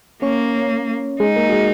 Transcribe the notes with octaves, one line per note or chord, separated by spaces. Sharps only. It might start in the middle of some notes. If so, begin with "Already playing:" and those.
A#3 C#4 C#5
G#3 D#4 G#4
A#3 A#4
F#4
G#3 G#4